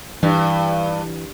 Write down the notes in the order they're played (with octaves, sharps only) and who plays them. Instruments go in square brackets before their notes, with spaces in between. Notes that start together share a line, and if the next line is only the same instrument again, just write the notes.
[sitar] G2 [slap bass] E3